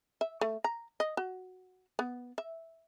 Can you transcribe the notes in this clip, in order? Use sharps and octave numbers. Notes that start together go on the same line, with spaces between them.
E5
A3
A#5
D#5
F#4
B3
E5